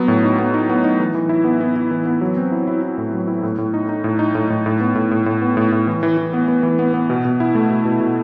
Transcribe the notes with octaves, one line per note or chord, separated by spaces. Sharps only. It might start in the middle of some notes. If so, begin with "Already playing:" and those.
Already playing: F#3 B3
A2
D#4
B3
D#4
B3
D#4
E3
E3
E4
B3
B3
E4
E3
B3
F#3
C4
E4
E4
E4
A2
F#3
E4
A2
A2
D#4
D#4
A2
D#4
A2
A2
A2
B3
A2
A2
A2
B3
A2
A2
E3
E3
E3
B3
B3
E3
B3
B3
B2
B2
E4
A3
B2
B2
B2